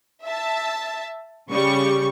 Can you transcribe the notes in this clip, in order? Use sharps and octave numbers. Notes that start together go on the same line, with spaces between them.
E5 A5
C#3 G3 C#6